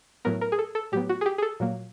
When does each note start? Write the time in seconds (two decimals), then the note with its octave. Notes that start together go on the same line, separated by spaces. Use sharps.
0.25 A2 F#3 B3 A#4
0.41 A#4
0.52 G#4
0.59 A4
0.75 A4
0.92 A2 F#3 B3 G4
1.09 F#4
1.21 G#4
1.26 G4
1.38 G#4
1.42 A4
1.60 A#2 F#3 A#3